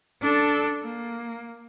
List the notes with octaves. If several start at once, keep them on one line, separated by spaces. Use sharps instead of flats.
D4 A4
A#3